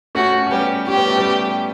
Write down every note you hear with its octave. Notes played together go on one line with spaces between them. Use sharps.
A3 C#4 F#4
C#4
G3 B3 G4
C#4 G4
B3
A3
G3 B3